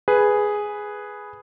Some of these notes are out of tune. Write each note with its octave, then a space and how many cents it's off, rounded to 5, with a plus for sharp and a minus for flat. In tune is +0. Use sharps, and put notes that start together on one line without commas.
G#4 +0 B4 +0